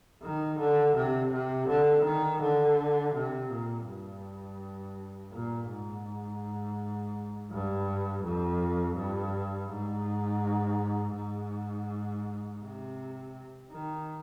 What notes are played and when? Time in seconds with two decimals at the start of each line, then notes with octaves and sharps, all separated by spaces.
0.23 D#3
0.59 D3
0.96 C3
1.33 C3
1.69 D3
2.05 D#3
2.42 D3
3.14 C3
3.51 A#2
3.87 G2
5.33 A#2
5.69 G#2
7.52 G2
8.24 F2
8.97 G2
9.70 G#2
11.16 G#2
12.62 C3
13.71 D#3